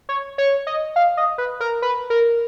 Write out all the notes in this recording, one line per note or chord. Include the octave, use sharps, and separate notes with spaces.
C#5
C#5
D#5
F5
D#5
B4
A#4
B4
A#4